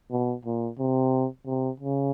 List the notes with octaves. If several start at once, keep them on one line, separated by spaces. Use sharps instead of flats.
B2
A#2
C3
C3
C#3